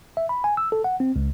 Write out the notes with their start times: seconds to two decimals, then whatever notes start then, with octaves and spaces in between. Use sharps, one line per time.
0.17 E5
0.29 B5
0.44 G#5
0.57 E6
0.72 A4
0.84 F#5
1.00 C4
1.16 C#2